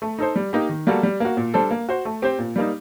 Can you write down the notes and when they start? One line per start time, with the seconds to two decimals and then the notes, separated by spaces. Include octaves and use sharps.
0.02 A3
0.19 D#4 A4 C5
0.36 G3
0.53 A#3 D#4 G4
0.69 D#3
0.87 G3 A#3 F#4 A4
1.03 G3
1.20 A#3 F#4
1.37 A#2
1.54 G3 D4 A4 C5
1.71 A#3
1.89 F#4 C5
2.05 A3
2.22 C4 G4 C5
2.39 A#2
2.56 G3 A#3 D#4